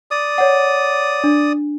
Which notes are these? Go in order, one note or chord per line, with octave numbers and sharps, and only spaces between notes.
D5 D#6
C#5 F#5
D4